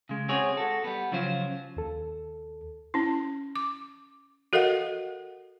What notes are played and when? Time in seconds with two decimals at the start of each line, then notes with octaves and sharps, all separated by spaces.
0.09 C#3 G#3
0.29 G#3 C4 F#4 G#4 C5 C#5
0.57 F#4 A4
0.84 G3 B3
1.12 C#3 F3 F#3 F4 C5
1.77 D#2 A4
2.94 C#4 E4
3.56 D6
4.53 F#4 A4 A#4 D#5 F5 F#5